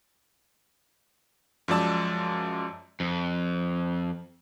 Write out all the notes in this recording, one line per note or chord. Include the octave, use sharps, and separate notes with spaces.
F#2 F3 G#3 D5 A5 E6
F2